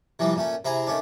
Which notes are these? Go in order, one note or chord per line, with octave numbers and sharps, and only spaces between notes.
C3 E3 F3 G3
A#2 A3 C#4
C3 E4 G#4 A#5
D#3 A3 C#4 D4